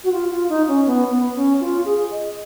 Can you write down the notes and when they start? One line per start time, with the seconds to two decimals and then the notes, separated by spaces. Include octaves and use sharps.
0.04 F#4
0.12 F4
0.30 F4
0.49 D#4
0.68 C#4
0.87 B3
1.11 B3
1.36 C#4
1.60 F4
1.85 G#4
2.11 D#5